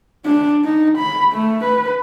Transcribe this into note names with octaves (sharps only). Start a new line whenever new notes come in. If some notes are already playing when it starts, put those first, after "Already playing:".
D4
D#4
B5
A3
B4